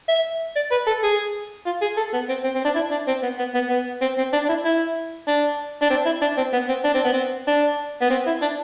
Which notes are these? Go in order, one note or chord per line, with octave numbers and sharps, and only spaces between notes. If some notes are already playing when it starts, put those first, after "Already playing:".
E5
D5
B4
A4
G#4
F4
G#4
A4
B3
C4
C4
C4
D4
E4
D4
C4
B3
B3
B3
B3
C4
C4
D4
D4
E4
E4
D4
D4
C4
E4
D4
C4
B3
C4
D4
C4
B3
C4
D4
B3
C4
E4
D4